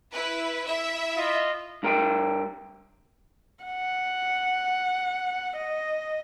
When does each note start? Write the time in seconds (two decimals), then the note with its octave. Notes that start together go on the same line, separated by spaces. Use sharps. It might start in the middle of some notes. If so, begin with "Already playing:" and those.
0.12 E4 B4
0.67 E4 E5
1.16 F4 D#5
1.83 G2 A#4 G5
3.65 F#5
5.57 D#5